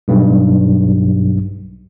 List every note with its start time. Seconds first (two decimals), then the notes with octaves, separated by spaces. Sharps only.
0.08 B1 G2